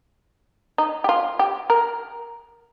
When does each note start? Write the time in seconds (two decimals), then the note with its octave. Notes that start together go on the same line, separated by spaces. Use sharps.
0.78 D#4
1.04 G4
1.09 F4
1.39 G4
1.70 A#4